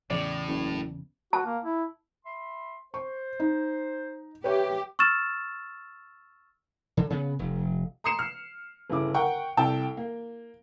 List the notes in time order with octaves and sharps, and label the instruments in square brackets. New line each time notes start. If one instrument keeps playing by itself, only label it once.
[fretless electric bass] E2 C#3 [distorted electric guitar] A2 [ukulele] D5
[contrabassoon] F#1
[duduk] F#4 [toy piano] A5
[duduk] A#3
E4
[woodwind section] E5 B5 C6
[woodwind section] C5 [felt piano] C#6
[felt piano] D#4
[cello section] G4 [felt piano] B4 C#5 E5 [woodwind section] G5
[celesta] C#6 E6 F6 A6 E7
[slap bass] D3
C#3 B3
F1
[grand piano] A#5 C6 D#6 C7 C#7 E7
F6
G1 C#3 E4 D6
A#4 F#5 G5 C#6
C2 A4 G5 A5 E6
A#3